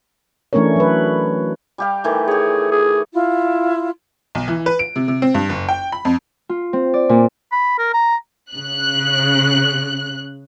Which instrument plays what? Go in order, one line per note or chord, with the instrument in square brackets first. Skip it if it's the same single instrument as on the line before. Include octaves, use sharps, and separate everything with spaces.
[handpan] E3 A3 C#4 D4 A#4 C#5
F#3 B4
[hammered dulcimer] G3 G4 F5
D#3 E3 A3
[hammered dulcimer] G4 C#5 [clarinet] G#4
[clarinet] G#4
[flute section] E4 F4
[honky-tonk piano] B1
E3
B4
D7
C3
C3
C4
G2
F#1
G5
B5
F2
[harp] F4
C4
D5
A#2
[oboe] B5
A#4
A#5
[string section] C#3 F#6